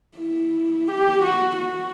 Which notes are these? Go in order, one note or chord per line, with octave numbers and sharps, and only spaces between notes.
E4
G4
F#4
F#4